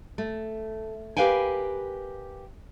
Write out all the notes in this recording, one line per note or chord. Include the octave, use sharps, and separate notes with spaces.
A3
G4 A#4 B4 F5 G5 G#5